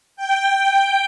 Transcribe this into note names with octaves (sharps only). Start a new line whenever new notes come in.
G5